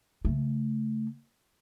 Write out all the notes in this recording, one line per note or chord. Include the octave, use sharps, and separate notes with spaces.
C#3 A3